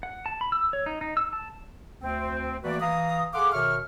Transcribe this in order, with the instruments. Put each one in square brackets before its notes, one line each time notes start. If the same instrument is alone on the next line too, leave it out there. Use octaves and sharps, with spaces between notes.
[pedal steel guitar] F#5
A5
B5
E6
C#5
D#4
D#4
E6
A5
[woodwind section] D2 C4
E3 A3 A#3 F#4 B4 D5
E3 F5 A#5 D#6
G#4 A4 F5 F#5 C6 D6
B2 D#3 C#5 E5 C#6 F6